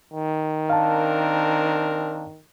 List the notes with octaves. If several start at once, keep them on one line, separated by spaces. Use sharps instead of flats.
D#3
C4 D4 A#4 F5 A5